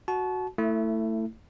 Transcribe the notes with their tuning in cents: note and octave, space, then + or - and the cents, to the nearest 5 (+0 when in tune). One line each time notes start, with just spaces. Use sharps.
F#4 +0 A5 -30
A3 +20 E4 +0